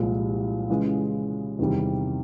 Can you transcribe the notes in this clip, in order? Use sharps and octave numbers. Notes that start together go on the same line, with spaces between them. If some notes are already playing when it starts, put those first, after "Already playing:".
Already playing: C2 A#2 F3 G#3
C#3 E3 G#3
E2 C3 D#3 G3